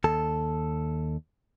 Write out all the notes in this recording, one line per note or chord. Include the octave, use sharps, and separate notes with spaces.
D#2 A4